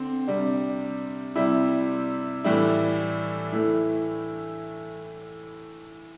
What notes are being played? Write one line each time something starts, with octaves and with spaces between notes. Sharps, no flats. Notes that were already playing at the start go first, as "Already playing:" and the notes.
Already playing: D3 C4
C3 G3 D4
C3 G3 E4
A2 E3 G3 E4
A2 E3 A3 E4